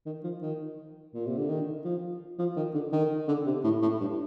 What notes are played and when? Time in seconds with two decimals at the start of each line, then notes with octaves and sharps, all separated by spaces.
0.06 D#3
0.23 F3
0.42 D#3
1.14 A#2
1.26 C3
1.38 D3
1.49 D#3
1.85 F3
2.39 F3
2.56 D#3
2.74 D3
2.92 D#3
3.28 D3
3.46 C3
3.64 A2
3.82 A2
4.00 G2